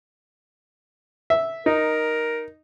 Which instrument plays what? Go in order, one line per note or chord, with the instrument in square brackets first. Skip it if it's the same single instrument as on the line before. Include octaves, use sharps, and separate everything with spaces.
[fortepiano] E5
[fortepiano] D#4 [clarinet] A#4